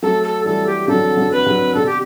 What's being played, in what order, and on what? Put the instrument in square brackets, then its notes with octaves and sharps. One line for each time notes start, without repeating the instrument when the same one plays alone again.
[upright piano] F#3 A3 [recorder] A4
[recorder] A4
[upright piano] E3 G3 [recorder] A4
[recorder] G4
[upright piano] D3 F#3 [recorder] A4
[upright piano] D3 F#3
[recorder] B4
[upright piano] D3 F#3
[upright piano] B2 D3 [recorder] A4
[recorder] G4